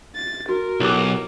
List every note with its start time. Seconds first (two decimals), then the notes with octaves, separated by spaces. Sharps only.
0.16 A6
0.49 F#4 A#4
0.80 B1 E4 G4 D6